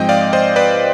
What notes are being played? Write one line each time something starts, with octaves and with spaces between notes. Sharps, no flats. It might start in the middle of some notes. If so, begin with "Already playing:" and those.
Already playing: G#2 F3 G#3 C4 D#5 G5
D5 F5
C5 D#5
B4 D5